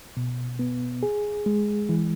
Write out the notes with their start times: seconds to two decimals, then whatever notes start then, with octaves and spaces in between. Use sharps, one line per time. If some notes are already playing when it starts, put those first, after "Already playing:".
0.17 B2
0.59 B3
1.03 G#4
1.46 G#3
1.89 E3